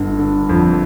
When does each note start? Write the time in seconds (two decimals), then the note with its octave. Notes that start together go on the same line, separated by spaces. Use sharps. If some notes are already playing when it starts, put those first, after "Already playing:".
Already playing: G1 D3
0.18 D3
0.49 F2